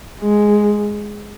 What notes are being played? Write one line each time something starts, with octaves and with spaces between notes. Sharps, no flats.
G#3